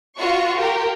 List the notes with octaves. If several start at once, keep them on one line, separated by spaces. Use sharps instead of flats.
F4 F#4 C#6
G4 A#4 G5